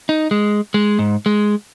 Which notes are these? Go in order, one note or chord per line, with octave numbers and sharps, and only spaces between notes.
D#4
G#3
G#3
G#2
G#3